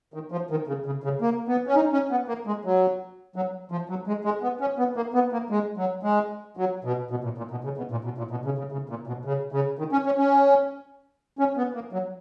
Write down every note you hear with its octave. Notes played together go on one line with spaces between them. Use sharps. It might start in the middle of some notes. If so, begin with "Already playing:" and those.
D#3
F3
D#3
C#3
C#3
C#3
A#3
B3
C#4
D#4
C#4
B3
A#3
G#3
F#3
F#3
F3
F#3
G#3
G#3
B3
C#4
B3
A#3
B3
A#3
G#3
F#3
G#3
F#3
B2
B2
A#2
A#2
B2
C#3
B2
A#2
B2
A#2
B2
C#3
C#3
C#3
A#2
B2
C#3
C#3
D#3
C#4
C#4
C#4
C#4
B3
A#3
F#3